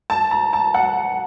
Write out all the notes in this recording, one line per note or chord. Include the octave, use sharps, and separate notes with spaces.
A5
A#5
A5
F#5